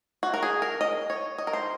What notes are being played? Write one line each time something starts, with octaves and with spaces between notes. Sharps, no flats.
F#4
A#4
G#4
A#4
D#5
C#5
D#5
A#4
C5